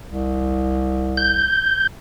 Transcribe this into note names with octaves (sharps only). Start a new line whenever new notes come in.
C2
G6